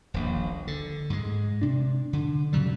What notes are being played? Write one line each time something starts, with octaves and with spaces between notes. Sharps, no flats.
D#1 A#1
D3
G#2 G#3
C3 D4
D3
A#2 C#3 F#3 G3